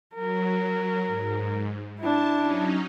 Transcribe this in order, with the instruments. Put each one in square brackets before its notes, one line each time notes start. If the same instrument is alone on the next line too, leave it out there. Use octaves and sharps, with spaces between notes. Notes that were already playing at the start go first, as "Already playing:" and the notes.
[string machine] F#3 [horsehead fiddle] A#4
[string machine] G#2
[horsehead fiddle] D4 E4 [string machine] A5
[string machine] F#3 C#4 D#4